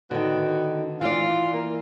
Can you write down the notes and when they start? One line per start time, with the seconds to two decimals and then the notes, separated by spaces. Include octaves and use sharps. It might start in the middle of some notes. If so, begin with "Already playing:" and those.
0.11 A2 D3 D#3 B3 F#4
1.01 E3 F4 D5 F5
1.53 A#3